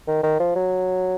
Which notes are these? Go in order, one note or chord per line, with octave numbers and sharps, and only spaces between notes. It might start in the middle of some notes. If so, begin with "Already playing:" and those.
D#3
D#3
F3
F#3